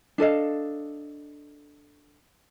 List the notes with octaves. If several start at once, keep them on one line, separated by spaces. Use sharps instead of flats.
D4 A4 D#5 F5